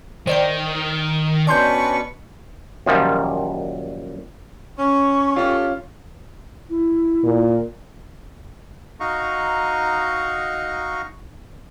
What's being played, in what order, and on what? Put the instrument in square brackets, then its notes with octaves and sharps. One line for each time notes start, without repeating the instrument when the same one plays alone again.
[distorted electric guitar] D#3 [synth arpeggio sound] C5 D5 G5
[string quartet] B2 B4 C#6 [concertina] C#4 D4 [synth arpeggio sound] D5 C6 G6
[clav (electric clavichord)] F#2 A#2 D#3 F3 G3
[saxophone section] C#4 [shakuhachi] C#6
[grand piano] C#4 F4 [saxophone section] G4 A4
[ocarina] E4
[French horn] A#2
[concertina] D#4 F#4 D#5 F5 A#5 C#6